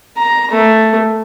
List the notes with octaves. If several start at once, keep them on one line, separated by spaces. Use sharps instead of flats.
A#5
A3